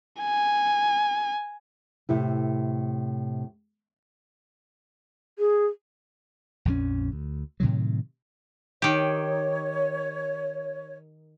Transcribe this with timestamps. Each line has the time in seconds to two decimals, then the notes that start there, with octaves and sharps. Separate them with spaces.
0.22 G#5
2.09 A2 C3 E4
5.39 G#4
6.65 A#1 F2 E3 C#4
7.12 D2
7.60 A2 C3 D#3 F#3
8.82 D#3 G4 C#5